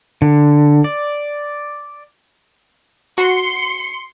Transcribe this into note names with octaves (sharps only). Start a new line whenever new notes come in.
D3
D5
F#4 C6 C#7